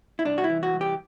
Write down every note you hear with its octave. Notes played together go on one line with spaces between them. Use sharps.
E4
C2 D4
F#4
E4
E3
F#4
C2
G4